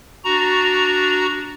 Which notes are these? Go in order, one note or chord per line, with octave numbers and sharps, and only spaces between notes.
D4 F#4 A#5